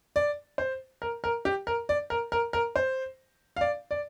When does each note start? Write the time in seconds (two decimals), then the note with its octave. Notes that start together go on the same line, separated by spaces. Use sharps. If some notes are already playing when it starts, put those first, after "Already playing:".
0.16 D5
0.58 C5
1.02 A#4
1.24 A#4
1.45 G4
1.67 A#4
1.89 D5
2.10 A#4
2.32 A#4
2.53 A#4
2.76 C5
3.56 F5
3.61 D5
3.91 D5